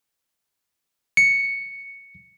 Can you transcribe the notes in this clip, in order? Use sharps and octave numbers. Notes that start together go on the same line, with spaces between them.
C#7